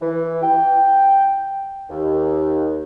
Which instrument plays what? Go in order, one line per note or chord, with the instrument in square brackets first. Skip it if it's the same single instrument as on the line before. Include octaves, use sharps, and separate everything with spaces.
[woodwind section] E3
G5
D#2